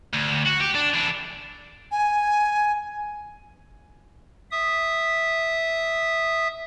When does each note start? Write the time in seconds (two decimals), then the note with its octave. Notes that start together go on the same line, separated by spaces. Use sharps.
0.13 D2
0.45 F#4
0.60 G4
0.74 D4
0.94 E3 D4
1.92 G#5
4.51 E5 D#6